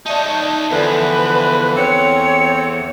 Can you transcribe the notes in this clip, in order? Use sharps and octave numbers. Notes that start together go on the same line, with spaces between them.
D#4 C#5 D5 E5 A5
E2 D3 E3 F3 A4 B4
C4 C#5 E6